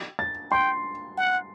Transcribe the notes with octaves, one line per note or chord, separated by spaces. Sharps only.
A6
G5 C6
F#5